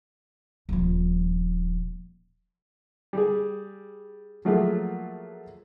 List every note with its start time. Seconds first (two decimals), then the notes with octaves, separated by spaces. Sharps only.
0.69 D#1 F3
3.13 G3 G#4
4.45 F3 F#3 A3 A#3 F4 G#4